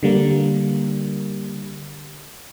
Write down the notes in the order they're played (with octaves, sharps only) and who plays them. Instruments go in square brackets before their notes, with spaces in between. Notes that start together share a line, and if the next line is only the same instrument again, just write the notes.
[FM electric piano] D3 G3 A#3